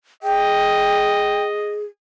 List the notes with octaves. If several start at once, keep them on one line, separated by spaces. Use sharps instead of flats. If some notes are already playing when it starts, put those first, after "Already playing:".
G#4 D#5 G5